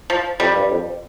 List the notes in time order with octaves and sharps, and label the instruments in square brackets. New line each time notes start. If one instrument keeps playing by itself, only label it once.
[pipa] F3
[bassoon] F2 [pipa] G3
[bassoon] G2
F2